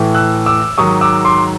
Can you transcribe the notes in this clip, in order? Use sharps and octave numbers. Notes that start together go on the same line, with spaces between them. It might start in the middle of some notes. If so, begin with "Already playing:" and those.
Already playing: A2 E3 A3
E6 F#6
D6 E6
G#2 D#3 F#3 C#6 D#6
D6 E6
C6 D6